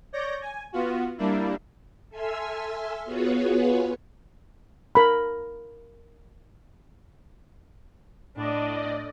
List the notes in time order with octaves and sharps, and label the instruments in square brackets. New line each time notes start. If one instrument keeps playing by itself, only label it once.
[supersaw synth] C#5 D5 G6 A#6
G#5
B3 F4 F#4
G3 A#3 D4 E4
[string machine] A4 E5 G#5 C6 E6 F6
B3 F4 F#4 G#4 B4 C#5
[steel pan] A#4 B5
[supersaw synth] A2 D5 D#5 [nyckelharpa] D4